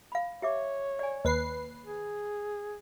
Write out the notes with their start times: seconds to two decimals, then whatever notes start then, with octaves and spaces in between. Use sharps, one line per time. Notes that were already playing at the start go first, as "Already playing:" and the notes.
0.12 F5 B5
0.42 G4 C#5 E5 D6
0.99 D5 G#5
1.25 D#2 B4 C7
1.85 G#4